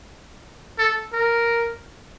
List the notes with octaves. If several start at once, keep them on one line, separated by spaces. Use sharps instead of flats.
A4
A#4